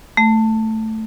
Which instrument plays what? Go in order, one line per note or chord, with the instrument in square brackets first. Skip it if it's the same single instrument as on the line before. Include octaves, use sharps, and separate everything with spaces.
[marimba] A3